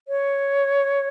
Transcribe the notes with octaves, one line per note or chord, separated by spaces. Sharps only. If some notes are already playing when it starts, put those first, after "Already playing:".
C#5